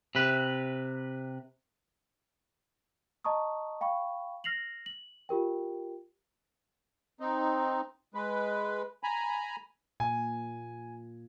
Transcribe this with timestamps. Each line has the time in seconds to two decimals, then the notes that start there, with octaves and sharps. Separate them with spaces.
0.15 C3 B4
3.25 D#5 A5 A#5 C#6 D#6
3.81 F5 G5 B5 C#6
4.44 F6 A#6 C7 F7 F#7
4.86 F#7
5.29 F4 G4 A#4 G5
7.20 C4 D#4
8.14 G#3 B4
9.03 G#5 A#5 B5
10.00 A#2 G#5